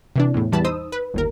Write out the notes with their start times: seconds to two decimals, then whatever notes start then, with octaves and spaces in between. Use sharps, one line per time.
0.16 C3 E3 D4
0.34 E2 A2
0.52 E2 E3 G3 A5 B5
0.64 D#4 C5 D#6 E6
0.92 B4
1.14 G1 D#2 A#4